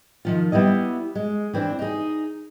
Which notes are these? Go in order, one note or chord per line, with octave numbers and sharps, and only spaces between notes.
D#3 F3 F4
G3 B3 E4 D#5
G#3
E3 C4 D4
D#4 G#4